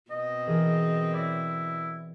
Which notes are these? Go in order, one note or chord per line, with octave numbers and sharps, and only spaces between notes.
B2 C4 D#5
E3 G#4 A#4
E4 D5